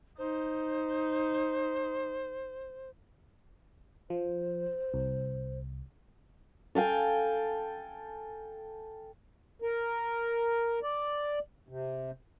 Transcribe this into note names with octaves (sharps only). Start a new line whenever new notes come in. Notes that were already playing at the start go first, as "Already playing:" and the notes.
D#4 C5
F3 C5
C2
A4 F5 G5 G#5
A#4
D5
C3